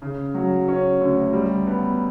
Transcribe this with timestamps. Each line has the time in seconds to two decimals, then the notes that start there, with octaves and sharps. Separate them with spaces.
0.02 C#3
0.34 F#3
0.68 C#4
1.01 D2
1.33 G3
1.67 B3